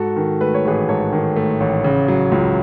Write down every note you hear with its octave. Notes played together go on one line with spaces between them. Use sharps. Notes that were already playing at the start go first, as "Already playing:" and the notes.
Already playing: G#2 F#4 A4
D#3
A3 B4
C#5
A1 G#4 B4
G#2 A4 C#5
D#3
A3
A1
C#3
F#3
C#2